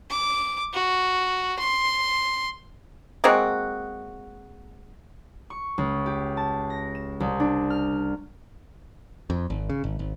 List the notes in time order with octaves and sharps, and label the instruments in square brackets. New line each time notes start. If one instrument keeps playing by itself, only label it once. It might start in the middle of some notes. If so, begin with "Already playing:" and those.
[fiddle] D6
F#4
C6
[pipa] G#3 A#3 C4 F#4
[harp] C#6
C#2
G4
A5
A#6
E7
C2
D4
F6
[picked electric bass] F2
G#1
C#3
G#1
G#1